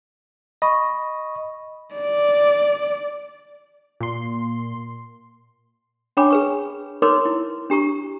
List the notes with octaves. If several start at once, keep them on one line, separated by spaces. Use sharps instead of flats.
D#5 B5 C#6
D5
A#2 C6
C#4 D4 C#5 G#5 B5 D6
G#4 B4 C#6
D#4 A#4 B4 C#5 C6 D6
E4
D4 G4 A#5 C#6